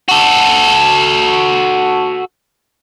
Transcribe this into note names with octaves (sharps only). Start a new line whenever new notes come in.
F#4 A4